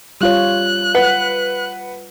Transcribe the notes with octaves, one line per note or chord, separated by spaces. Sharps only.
G3 F4 C#5 F#6
B4 F#5